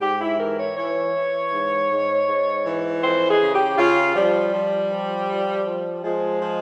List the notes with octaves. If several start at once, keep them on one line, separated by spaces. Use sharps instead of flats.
G#2 G4
E4
E3 A#4
C#5
E3 C#5
E3
G#2
G#2
G#2
E3
F2 C5
G#4
C#3
G4
C#3 F4
F3 G3
F3
F3
F3
F3
F3 G#3
F3